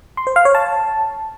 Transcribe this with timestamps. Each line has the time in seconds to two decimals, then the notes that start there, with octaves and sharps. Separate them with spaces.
0.17 C6
0.27 C5
0.36 F5
0.45 C#5
0.55 A5